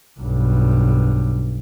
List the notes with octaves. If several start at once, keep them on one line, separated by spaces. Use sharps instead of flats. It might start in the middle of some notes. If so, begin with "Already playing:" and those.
B1 G2